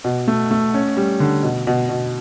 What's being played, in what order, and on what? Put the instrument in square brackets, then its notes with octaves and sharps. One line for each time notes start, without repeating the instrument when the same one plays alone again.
[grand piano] B2
A3
A3
C#4
G3
D3
B2
B2
B2